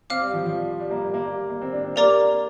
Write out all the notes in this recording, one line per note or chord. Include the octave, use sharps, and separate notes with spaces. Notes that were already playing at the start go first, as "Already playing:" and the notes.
C4 F5 D6 F6
G3
F3
F3
G3
G3
A#3
G3
A#3
G3
A#3
C4
D4
C4
A#3 G4 A#4 D5 A#5 D6
D4